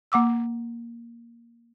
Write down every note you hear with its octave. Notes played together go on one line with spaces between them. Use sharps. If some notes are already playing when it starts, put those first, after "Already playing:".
A#3 F#5 D6 E6